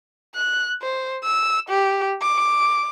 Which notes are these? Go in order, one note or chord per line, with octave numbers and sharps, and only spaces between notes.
F#6
C5
E6
G4
D6